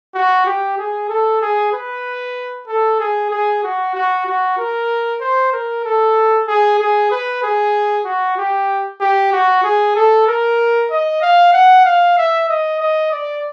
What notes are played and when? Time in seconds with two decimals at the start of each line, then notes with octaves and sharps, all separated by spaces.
0.15 F#4
0.46 G4
0.78 G#4
1.09 A4
1.42 G#4
1.72 B4
2.67 A4
3.00 G#4
3.31 G#4
3.63 F#4
3.95 F#4
4.26 F#4
4.58 A#4
5.20 C5
5.53 A#4
5.85 A4
6.48 G#4
6.79 G#4
7.11 B4
7.43 G#4
8.05 F#4
8.38 G4
9.01 G4
9.32 F#4
9.64 G#4
9.96 A4
10.28 A#4
10.91 D#5
11.22 F5
11.53 F#5
11.85 F5
12.17 E5
12.49 D#5
12.80 D#5
13.11 D5